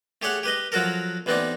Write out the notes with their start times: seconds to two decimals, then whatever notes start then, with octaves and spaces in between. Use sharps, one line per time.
0.22 A3 G4 G#4 C#5 F#5
0.43 G4 B4 D#5
0.72 F3 F#3 F#4 A4 A#4
1.26 A1 E3 B3 C4 D#4 D5